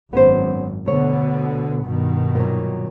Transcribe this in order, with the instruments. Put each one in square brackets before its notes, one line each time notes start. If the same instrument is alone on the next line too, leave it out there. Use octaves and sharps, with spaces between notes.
[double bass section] G#1 F#2 [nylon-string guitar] B3 C#4 C5
[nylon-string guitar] D2 C#5 [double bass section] B2 D3 B3
[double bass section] G2 B2 D#3
[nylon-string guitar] A#2 F#3